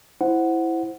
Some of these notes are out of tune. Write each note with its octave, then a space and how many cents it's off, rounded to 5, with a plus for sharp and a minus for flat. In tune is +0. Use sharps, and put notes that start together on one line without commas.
E4 +0 C5 +0 F#5 +0